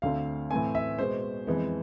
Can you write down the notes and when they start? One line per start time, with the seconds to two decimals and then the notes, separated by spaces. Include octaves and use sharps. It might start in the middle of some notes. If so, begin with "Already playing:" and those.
0.02 D2 D3 A3 C4 F5
0.51 A2 E3 A3 C4 G#5
0.75 E5
0.98 B2 G#3 B3 C5
1.47 F2 E3 G#3 B3